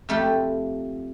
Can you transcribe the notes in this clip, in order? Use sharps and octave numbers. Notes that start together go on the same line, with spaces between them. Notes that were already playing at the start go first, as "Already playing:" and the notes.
F2 A3 G4 B5